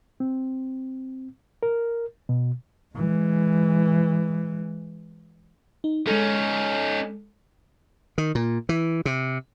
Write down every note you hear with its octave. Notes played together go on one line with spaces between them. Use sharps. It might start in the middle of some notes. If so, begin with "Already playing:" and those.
C4
A#4
B2
E3 G#3
D#4
G#3 C#4 D#4 A4
D#3
A#2
E3
C3